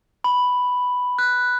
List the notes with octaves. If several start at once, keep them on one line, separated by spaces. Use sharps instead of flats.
B5
F#6